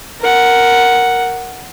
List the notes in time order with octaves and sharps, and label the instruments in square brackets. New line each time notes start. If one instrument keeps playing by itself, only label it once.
[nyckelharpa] A#4 F#5